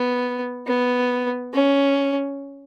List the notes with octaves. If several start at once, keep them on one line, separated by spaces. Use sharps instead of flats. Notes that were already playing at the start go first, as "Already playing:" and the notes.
Already playing: B3
B3
C#4